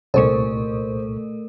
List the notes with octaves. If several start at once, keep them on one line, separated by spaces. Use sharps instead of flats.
C2 A#2 A3 A4 A#4 C5 C#6